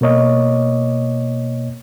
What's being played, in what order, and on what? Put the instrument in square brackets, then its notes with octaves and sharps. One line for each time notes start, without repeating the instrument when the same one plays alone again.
[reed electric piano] B2 A#3 C#5 D#5